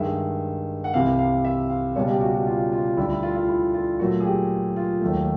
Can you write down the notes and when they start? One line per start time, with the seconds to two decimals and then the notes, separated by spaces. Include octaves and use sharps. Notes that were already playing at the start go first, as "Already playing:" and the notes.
Already playing: G2 D#3 G#3 E5
0.84 F#5
0.93 C2 C3 E3 F5
1.19 F5
1.45 E5
1.69 F5
1.96 C#2 B2 G3 C#5
2.08 G4
2.21 F#4
2.34 F#4
2.47 F4
2.72 F4
2.97 D2 D3 G3 E4
3.10 E4
3.23 F4
3.36 F4
3.49 E4
3.74 F4
3.99 A#2 F#3 A3 F#4
4.20 G#4
4.25 G4
4.76 F4
5.01 D#2 D#3 F#3 A3